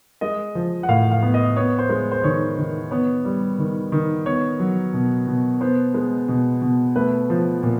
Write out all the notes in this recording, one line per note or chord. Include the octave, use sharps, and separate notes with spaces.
G#3 D#5
F3
F#5
A2 F5
F5
B3
D#5
B3 C#5
C5
G#3
C5
D#3 C#5
D#3
B3 C#5
G3
D#3
D#3
B3 C#5
F#3
B2
B2
B3 C5
G#3
B2
B2
A3 B4
F3
A#2